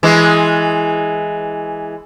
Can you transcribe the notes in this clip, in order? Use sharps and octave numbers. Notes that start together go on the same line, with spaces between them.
E3 G#3